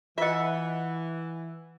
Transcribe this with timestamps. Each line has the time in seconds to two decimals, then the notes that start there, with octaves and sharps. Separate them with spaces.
0.18 E3 F4 D#5 E5 F#5